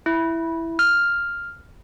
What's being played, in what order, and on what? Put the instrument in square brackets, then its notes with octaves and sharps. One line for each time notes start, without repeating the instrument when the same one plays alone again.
[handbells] E4
F6